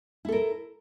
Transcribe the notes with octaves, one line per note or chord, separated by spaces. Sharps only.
E4 A4 A#4